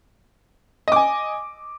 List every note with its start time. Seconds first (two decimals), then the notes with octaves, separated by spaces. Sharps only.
0.88 D#5
0.92 D6
0.96 G#5